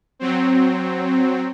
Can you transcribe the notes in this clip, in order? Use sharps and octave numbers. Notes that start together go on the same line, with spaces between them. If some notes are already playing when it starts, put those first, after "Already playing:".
F#3 C4